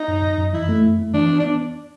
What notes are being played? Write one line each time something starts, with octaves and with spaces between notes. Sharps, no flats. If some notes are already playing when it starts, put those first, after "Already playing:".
Already playing: D#4
F#2
F#2
F#2
E3 E4
A3
F#2
A3
E3 D4
B3
D4